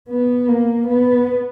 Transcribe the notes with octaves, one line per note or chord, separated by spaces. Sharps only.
B3
A#3
B3